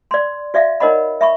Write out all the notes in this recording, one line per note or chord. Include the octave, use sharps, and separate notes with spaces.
D5 C6
F#4 D5 E5 F5
D#4 A#4 C#5 D#5 F#5 B5
E5 B5 C#6